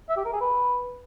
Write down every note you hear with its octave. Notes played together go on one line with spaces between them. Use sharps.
E5
G4
A#4
G#4
B4